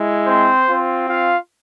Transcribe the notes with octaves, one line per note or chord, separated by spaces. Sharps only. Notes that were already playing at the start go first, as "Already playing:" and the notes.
Already playing: G#3 E4
C4 C5
C4 F4
F4 F5